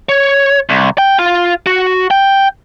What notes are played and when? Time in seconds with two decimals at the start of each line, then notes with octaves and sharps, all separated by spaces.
0.09 C#5
0.69 C2
0.98 G5
1.19 F4
1.66 F#4
2.11 G5